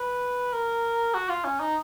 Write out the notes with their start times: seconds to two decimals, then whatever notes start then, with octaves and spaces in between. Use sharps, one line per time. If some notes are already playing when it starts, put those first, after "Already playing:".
Already playing: B4
0.53 A#4
1.14 F#4
1.29 F4
1.44 C#4
1.60 D#4